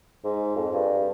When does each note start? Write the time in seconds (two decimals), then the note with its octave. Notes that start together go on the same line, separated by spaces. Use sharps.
0.24 G#2
0.56 F2
0.73 G2